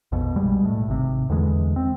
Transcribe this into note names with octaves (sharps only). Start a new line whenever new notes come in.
A#1 F2 B2
B1 B2 G3 G#3
A2
G#1 C3
E2 D3 E3 G#3
C4